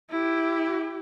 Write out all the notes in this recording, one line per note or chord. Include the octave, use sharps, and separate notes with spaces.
E4 G4